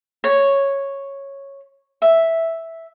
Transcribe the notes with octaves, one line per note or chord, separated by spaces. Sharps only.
C#5
E5